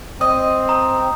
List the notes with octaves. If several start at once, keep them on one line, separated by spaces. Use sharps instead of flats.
C4 D#5 D#6
A#5 D#6